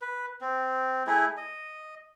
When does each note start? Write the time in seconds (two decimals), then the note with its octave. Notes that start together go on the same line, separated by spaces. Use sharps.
0.01 B4
0.41 C4
1.07 A3 E4 G#4
1.37 D#5